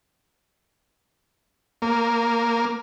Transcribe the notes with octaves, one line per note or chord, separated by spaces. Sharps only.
A#3